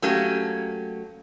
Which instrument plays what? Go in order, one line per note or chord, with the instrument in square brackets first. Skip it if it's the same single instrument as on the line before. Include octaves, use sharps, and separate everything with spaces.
[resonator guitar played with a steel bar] F#3 A3 A#3 C#4 G4